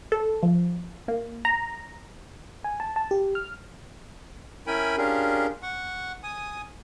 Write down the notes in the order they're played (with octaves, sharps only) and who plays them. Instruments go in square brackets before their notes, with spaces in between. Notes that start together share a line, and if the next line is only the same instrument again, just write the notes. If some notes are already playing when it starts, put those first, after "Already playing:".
[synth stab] A4
F3
A#3
A#5
[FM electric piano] G#5
A5
A5
G4
F6
[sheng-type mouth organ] C#4 E4 A#4 G5 G#5 B5
C#4 D4 F4 G4 G#4 A#4
F#5 C#6
G#5 D#6